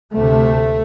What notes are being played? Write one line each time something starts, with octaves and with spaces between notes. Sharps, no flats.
D2 C3 A3